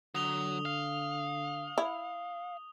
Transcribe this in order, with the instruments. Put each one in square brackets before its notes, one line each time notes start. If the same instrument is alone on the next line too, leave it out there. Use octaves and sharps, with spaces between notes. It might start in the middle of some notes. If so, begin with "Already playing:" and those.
[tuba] D3 [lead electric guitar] F#3 [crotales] D#6 F7 G7
[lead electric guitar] F5
[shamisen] E4